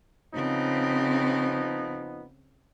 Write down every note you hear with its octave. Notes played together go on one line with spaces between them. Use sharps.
C#3 F3 B3 C4 D#4